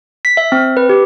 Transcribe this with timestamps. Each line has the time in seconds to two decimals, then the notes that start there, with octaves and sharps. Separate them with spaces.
0.25 B6
0.37 E5
0.52 C4
0.77 B4
0.89 G4